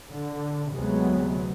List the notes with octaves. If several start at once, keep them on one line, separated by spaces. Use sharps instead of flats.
D3
D2 C3 F#3 G#3 B3